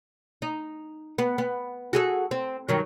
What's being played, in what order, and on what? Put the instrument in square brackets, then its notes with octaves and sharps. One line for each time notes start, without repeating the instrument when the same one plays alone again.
[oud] D#4
B3
B3
F#4 G#4 A4
C4
G2 D#3 F#3